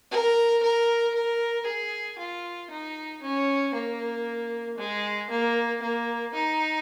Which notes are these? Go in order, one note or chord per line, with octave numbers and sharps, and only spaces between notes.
A#4
A#4
A#4
G#4
F4
D#4
C#4
A#3
G#3
A#3
A#3
D#4